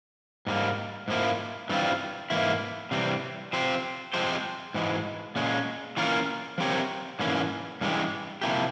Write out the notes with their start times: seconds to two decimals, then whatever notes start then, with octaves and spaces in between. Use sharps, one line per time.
0.47 G#2 G3 A#3
1.08 G#2 F3 A#3 E4
1.69 G2 E3 G3 C4 F4
2.30 G#2 E3 A#3 E4
2.91 C3 E3 G3 C4
3.53 F3 C4 G4 C5
4.13 F3 G#3 C4 G4 C5
4.74 G#2 E3 G#3
5.36 A#2 G#3 C#4
5.97 E3 A#3 C#4 F4 A#4
6.58 F3 C4 G4 A#4 C#5
7.19 G#2 E3 A#3 C#4
7.81 G2 E3 G#3 C#4 G4
8.41 C3 F3 A#3 E4 G4